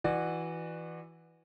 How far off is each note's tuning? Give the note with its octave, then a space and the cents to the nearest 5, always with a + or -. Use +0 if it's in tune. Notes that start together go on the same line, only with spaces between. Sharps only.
E3 +0 F#4 +0 D5 +30